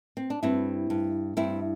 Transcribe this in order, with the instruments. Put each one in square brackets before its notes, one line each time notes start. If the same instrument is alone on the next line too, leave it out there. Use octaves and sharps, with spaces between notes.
[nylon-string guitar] C4
D4
G2 C4 E4
G2
G2 C4 E4